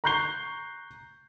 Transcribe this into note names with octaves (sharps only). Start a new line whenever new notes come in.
A#5 C#6 F#6 G6 C7 G7